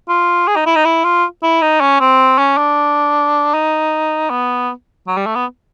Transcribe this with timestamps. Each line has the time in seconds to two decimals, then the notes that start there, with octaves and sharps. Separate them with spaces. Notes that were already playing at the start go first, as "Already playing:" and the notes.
0.09 F4
0.48 G#4
0.56 D#4
0.67 E4
0.76 D#4
0.85 E4
1.05 F4
1.43 E4
1.62 D#4
1.81 C#4
2.00 C4
2.38 C#4
2.58 D4
3.54 D#4
4.30 B3
5.08 F#3
5.17 G3
5.26 A3
5.35 B3